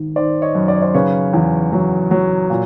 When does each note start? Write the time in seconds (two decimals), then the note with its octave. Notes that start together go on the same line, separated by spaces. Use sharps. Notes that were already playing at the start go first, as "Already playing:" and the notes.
Already playing: G#1 D#3
0.16 D#3 C5 D5
0.42 C#5 D#5
0.55 F#2
0.68 D5
0.75 C#5
0.82 C5 D5
0.94 C#3 B4 C#5
1.33 E2
1.72 F#3
2.11 F#3
2.50 A#2